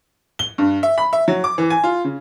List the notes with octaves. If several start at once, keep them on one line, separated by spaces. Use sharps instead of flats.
G7
G2
E5
B5
E5
F#3
D6
E3
G#5
F4
C#3